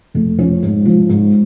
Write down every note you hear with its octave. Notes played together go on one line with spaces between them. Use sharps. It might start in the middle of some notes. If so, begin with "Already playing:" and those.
F2 A3
F3 C#4
G#2
F3
G#2